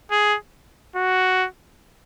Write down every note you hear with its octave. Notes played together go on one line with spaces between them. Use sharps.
G#4
F#4